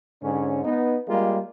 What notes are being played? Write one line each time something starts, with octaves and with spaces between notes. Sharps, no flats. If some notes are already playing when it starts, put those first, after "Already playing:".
G#2 D3 C#4
B3 D#4
G3 G#3 A#3 F4